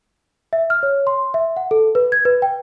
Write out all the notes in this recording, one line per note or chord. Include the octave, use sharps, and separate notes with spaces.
E5
F6
C#5
C6
E5
F#5
A4
B4
G#6
B4
G5